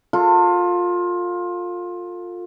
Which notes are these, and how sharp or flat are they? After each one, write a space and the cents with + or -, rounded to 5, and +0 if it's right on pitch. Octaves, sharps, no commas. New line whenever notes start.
F4 +20 A4 +35